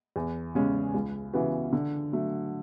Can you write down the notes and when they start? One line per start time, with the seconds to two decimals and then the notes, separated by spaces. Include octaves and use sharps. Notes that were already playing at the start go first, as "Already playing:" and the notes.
0.16 E2
0.55 C#3 G#3 C#4
0.94 C#2
1.33 C#3 E3 B3 F#4
1.73 D3
2.12 F#3 A3